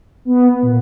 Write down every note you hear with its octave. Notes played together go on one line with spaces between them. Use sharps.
B3
A#2